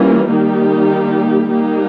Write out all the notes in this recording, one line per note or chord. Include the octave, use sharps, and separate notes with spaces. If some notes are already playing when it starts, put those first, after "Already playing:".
Already playing: E3 G3 A#3 C#4 F4
D#3 G3 A#3 D#4 G4
G3 A#3 D#4 G4